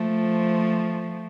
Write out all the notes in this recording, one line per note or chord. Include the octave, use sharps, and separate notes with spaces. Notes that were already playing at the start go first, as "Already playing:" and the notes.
Already playing: F3 A3